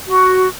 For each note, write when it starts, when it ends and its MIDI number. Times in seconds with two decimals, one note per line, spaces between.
0.07 0.47 66